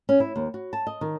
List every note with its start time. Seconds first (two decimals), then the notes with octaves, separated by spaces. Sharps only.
0.09 C#4
0.20 E4
0.36 D#2
0.54 F#4
0.73 A5
0.87 D#5
1.01 D#3